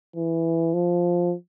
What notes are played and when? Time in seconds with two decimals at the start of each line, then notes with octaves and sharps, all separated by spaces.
0.16 E3
0.74 F3